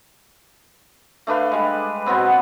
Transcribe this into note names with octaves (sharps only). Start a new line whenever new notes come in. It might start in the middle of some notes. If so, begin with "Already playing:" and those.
A3 D4 B4 F5
G3 G#3
B2 F#3 B3 C4